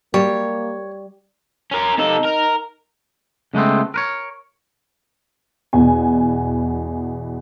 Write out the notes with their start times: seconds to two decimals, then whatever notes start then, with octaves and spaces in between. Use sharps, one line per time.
0.14 G3 A#3 C#5
1.72 C#4 A#4
1.98 C3 D#4 A4
2.25 A#4
3.54 C#3 G#3 A3 B3 C4
3.94 A#4 B4 C#5
5.73 E2 B2 G#5